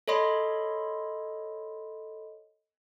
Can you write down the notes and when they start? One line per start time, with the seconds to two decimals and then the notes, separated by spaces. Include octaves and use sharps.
0.08 A4 C#5 D#5 B5 C6